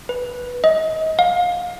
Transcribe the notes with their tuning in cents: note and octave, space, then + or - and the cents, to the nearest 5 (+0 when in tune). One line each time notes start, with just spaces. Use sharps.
B4 -5
D#5 +30
F5 +30